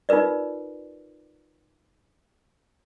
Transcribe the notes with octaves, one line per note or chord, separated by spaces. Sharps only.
D#4 F4 A#4 B4 D5